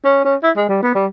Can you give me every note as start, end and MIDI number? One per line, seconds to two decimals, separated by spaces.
0.04 0.24 61
0.24 0.36 61
0.43 0.51 64
0.56 0.64 56
0.69 0.80 55
0.83 0.93 59
0.95 1.06 55